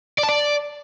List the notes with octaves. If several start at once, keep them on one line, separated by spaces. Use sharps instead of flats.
D5
A5
D5